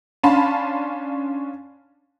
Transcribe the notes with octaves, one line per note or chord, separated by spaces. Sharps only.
C#4 D4 F5 A5 B5 C6